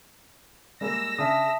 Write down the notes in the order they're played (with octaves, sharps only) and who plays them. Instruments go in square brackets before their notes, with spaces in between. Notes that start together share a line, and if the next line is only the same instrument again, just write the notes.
[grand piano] G3 G#3 A#3 [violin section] E6 A#6
[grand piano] C#3 D4 [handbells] E5 A5 D#6